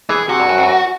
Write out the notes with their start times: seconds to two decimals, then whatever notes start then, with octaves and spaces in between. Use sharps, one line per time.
0.09 E3 G#4
0.29 C3 F#4
0.40 G2
0.49 F#2
0.58 F2
0.63 F#2